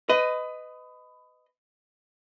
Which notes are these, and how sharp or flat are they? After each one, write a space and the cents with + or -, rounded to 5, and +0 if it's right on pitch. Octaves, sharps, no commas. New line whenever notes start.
B4 +25 D#5 +0